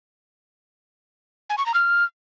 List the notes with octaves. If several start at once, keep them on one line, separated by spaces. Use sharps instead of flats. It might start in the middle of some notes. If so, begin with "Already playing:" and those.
G#5
C#6
A#5
F6